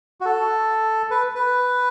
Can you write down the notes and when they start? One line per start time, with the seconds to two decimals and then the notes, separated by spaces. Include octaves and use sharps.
0.21 F#4
0.26 A4
1.11 B4
1.35 B4